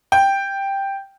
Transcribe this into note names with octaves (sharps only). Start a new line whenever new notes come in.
G5